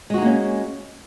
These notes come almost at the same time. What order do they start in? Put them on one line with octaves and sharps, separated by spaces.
G#3 F#4 D#4 A#3 C#4